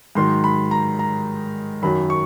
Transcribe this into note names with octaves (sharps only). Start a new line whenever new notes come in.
G#2 D#3 F#3 C6
B5
A#5
A#5
F#2 D#3 F#3 B5
C#6